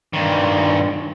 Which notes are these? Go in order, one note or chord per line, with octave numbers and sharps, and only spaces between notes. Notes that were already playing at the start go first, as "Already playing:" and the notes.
G2 D#3